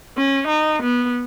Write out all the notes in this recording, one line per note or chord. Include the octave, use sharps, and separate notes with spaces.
C#4
D#4
B3